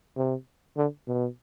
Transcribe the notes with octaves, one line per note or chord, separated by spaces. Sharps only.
C3
D3
B2